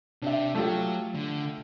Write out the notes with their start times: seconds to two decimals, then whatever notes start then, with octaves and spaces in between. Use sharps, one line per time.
0.22 C3 D4 G4 E5
0.55 F#3 A3 F4 G4
1.15 D3